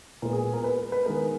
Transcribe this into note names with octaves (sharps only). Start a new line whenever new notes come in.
A#2 G#3 B3 A#4
G#4
G#4
A#4
B4
B4
D#3 G#3 B3 A#4